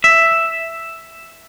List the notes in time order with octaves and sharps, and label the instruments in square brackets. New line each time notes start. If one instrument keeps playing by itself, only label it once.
[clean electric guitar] E5